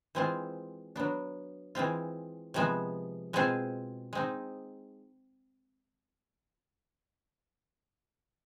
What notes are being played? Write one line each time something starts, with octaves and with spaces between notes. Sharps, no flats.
E3 G#3 C4 F4
F#3 B3 D4
E3 G#3 C4 F4
C3 F3 G#3 B3
B2 G#3 C4 F4 G#4
G#3 C4 D#4